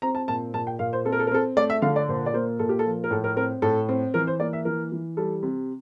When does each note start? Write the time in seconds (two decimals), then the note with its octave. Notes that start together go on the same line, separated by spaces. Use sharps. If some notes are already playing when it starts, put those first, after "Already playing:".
0.02 C4 A#5
0.15 A5
0.28 A#2 A5
0.54 A#2 A5
0.67 G5
0.79 A#2 F5
0.93 C5
1.05 C4 A4
1.12 A#4
1.20 A4
1.27 A#4
1.32 C4 A4
1.57 A3 D5
1.70 E5
1.82 D3 F5
1.96 D5
2.09 A#2 C5
2.26 D5
2.34 A#3 C5
2.59 A#2 A4
2.69 G4
2.79 A4
2.86 F3
3.04 A#4
3.11 A2 A4
3.24 A#4
3.36 C4 A#4
3.62 A2 A4
3.89 C4
4.14 E3 A#4
4.27 C5
4.40 A#3 D5
4.53 E5
4.65 E3 A#4
4.92 E3
5.17 G3 A4
5.43 C3